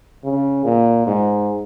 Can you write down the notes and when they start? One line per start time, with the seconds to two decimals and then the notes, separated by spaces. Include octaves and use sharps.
0.24 C#3
0.65 A#2
1.07 G#2